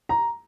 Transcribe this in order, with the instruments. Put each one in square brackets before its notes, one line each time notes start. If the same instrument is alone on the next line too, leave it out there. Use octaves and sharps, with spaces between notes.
[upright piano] A#5